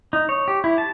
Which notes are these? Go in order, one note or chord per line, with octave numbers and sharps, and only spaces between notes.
D#4
C#5
G4
E4
A5